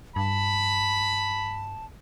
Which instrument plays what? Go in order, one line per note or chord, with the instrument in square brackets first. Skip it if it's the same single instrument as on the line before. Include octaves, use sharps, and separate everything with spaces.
[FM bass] G2 [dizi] A5 [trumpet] B5